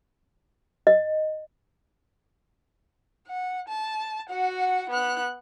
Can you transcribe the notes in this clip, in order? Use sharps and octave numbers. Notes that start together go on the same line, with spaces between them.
D#5
F#5
A5
F#4 F#5
B3 F#6